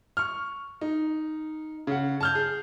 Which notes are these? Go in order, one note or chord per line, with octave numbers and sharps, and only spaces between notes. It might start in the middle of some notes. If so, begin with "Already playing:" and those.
C#6 F6
D#4
C#3 F#5
A5 F6 G6
G#4